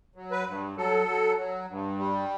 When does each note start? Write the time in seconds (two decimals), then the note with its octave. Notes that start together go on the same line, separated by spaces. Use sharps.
0.16 F#3
0.31 B4
0.47 G2
0.77 F#3 A4
1.08 F#3
1.38 F#3
1.69 G2
1.99 G3